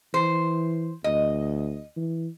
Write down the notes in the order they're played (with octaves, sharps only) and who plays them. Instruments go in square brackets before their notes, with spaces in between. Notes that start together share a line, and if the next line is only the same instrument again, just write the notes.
[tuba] E3 [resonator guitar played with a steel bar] C5
[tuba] D2 [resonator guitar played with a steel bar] D#5
[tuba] E3